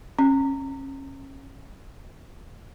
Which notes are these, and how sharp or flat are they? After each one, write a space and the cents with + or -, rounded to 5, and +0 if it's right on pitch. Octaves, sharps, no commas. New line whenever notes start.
C#4 -30